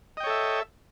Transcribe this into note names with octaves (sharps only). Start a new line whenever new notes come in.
A4 C#5 D#5 E5 G5